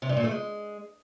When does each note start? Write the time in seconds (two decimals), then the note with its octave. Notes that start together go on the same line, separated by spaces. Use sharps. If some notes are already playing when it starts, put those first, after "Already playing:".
0.02 C3
0.09 G2
0.17 A#2
0.24 A3
0.31 G#3